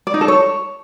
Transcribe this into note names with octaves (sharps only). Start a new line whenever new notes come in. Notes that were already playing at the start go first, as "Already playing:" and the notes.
D5
D#4
A4
C#5